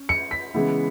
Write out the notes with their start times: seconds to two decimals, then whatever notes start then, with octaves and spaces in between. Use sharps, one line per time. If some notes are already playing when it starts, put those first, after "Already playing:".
Already playing: C#4
0.09 C#7
0.31 B6
0.54 C#3 E3 G#3 B3 E4